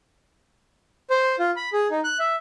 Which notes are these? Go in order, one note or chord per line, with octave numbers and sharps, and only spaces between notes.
C5
F4
B5
G#4
D#4
F#6
E5